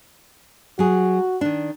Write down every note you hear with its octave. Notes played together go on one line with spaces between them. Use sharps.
F#3 F#4 G#4
D#3 D4